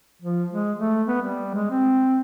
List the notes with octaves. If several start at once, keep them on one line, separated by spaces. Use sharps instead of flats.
F3
G#3
A3
B3
G3
G#3
C4